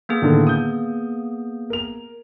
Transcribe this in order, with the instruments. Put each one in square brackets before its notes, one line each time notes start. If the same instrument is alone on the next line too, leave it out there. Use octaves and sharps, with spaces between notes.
[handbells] A#3 B3 G#4
[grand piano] A2 D3 D#3
D#6 G6
A#4 F7